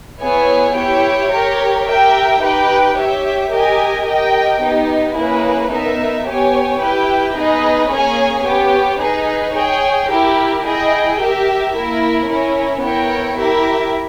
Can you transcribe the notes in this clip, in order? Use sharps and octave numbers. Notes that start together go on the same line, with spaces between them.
B3 E4 G#4 C#5 G#5
E4 G4 C#5 G5
G4 A#4 C#5
G4 A#4 E5 G5
D#4 G4 B4 G5
G4 C#5 E5
G4 A#4 D#5 G#5
G4 A#4 D#5 G5
B3 D#4 G4
A#3 C#4 E4 G#4 B4
B3 D#4 A#4 E5
B3 G4 C#5 G#5
E4 G4 B4 G5
B3 D#4 G#4 B4 D#5
A#3 C#4 G#4 C#5 G#5
B3 G4 C#5
D#4 G#4 B4
G#4 C#5 G5
E4 G4 A#4
E4 G#4 D#5 G5
G4 A#4 E5
A#3 E4 A#4
C#4 E4 A#4
B3 E4 A#4 C#5 G5
E4 G4 A#4 E5